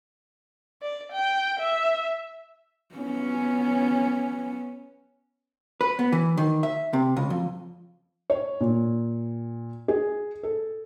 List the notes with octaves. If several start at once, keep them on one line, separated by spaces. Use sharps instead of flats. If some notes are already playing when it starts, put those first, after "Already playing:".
D5
G5
E5
B3 C#4
B4
B3
E3
D#3
E5
C3
C#2
F2
C#5
A#2
G#4
A4